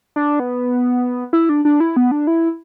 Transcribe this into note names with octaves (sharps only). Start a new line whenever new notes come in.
D4
B3
E4
D4
D4
E4
B3
D4
E4